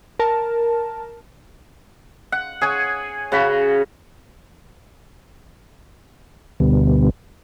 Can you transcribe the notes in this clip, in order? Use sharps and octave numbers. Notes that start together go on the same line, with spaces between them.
A#4 A5
F#5
G#4 C#5 G#5
C#3 F#4 B5
D2 B2 D3 G3 B3